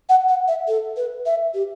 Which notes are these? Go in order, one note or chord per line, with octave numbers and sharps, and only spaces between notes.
F#5
F#5
E5
A4
B4
E5
G4